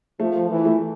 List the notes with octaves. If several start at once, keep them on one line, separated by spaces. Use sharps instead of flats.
F3 A3
E3
A3